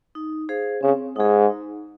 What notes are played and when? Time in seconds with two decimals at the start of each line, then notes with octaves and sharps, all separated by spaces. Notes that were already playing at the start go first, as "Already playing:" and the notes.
0.15 D#4
0.49 G#4 C5 F5
0.82 C#3 C4
1.16 G#2 D#4 G#4
1.50 D#4